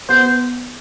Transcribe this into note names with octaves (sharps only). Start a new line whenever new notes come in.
B3 C5